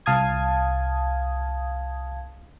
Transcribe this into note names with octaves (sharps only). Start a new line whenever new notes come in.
C2 F5 A5 D#6 G#6